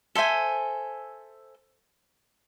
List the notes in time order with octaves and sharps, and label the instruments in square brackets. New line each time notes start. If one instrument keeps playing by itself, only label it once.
[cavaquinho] A4 C5 E5 G#5